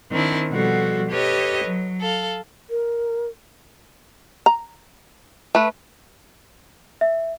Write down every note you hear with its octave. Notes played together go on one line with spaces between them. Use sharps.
D#3 C4 D4 E4
B2 F3 G3 F#4 A4
G4 A4 B4 C#5 D#5
F#3
A4 F5
A#4
A#5
A3 B4
E5